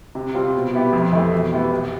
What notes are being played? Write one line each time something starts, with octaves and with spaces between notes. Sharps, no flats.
C3
G3 C4 F4
B2
B3 E4 G4
F2
E3 A3
B2
B3 E4 G4
C2